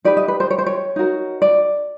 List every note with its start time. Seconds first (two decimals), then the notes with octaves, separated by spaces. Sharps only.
0.05 D#4 G4 B4 D5
0.17 D#5
0.28 B4
0.40 C5
0.50 C#5
0.59 C5
0.66 C#5
0.96 D#4 F#4 A#4
1.42 D5